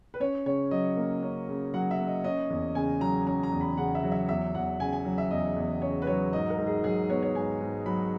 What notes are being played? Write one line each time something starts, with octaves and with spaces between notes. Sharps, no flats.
B4
C#4 C#5
C#3 C#5
F#3 D#5
A#3
C#4
C#3
F#3 F#5
E5
A#3
D#5
C#4 D#5
E2
C#3 G#5
F#3 A#5
C#4 A#5
A#5
E2
B5
C#3 F#5
E5
F#3
E5
E2 E5
E2 F#5
C#3 G#5
G#5
F#3
E5
E2 D#5
E2
C#3 C#5
B4
F#3 C#5
G#2 D#5
A#4
G#2
G#4
F#3 G#4
B3 C#5
C#5
G#2 G#5
G#2
F#3 B5